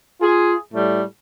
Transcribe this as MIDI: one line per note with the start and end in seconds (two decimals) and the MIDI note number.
0.21 0.55 65
0.21 0.55 68
0.73 1.03 45
0.73 1.03 55
0.73 1.03 57